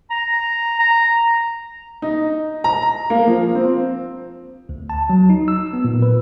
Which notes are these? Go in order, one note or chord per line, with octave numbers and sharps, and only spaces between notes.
A#5
A#5
D#4
A#5
A#3
F3
C4
D2
A5
F#3
D#4
E6
B3
A#2
B4